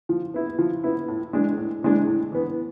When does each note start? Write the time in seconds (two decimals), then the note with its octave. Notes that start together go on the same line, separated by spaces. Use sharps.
0.09 F3
0.34 B3 E4
0.59 F3
0.84 B3 E4
1.08 A2
1.33 E3 G#3 D4
1.58 A2
1.83 E3 G#3 D4
2.07 A2
2.32 E3 B3